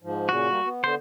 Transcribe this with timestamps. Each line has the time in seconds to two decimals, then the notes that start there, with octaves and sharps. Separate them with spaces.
0.03 G#2 F3
0.29 A#2 C#3 F#4
0.49 G3 A#3
0.64 B3
0.84 D3 B3 C5